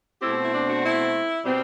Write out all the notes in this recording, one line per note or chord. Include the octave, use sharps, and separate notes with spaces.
B2 A3 C4 E4 G4
E4
D4
D4 F#4
E4
B2 G3 C4